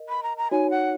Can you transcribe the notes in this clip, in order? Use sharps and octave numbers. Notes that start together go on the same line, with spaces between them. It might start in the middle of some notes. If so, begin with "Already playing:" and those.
Already playing: A#4 D#5
B5
A#5
A#5
D#4 F#4 C#5 G#5
F#5